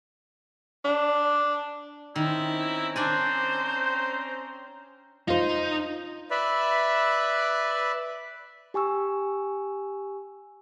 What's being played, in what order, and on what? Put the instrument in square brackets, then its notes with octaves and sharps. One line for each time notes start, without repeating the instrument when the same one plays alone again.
[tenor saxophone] D4
[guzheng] D#3 [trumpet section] C4 C#4 A#5 [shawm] E4
[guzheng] D4 D5 G#5 [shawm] C5
[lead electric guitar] D#4 [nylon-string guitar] F4 C5
[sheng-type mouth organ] B4 D5 E5 B5
[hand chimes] G4 G#5 C#6 E6